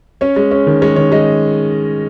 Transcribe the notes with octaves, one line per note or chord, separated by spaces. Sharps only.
C#4 C#5
G#3
C#4
D#3
G#3 C#5
D#3 C#5
G#3 D#5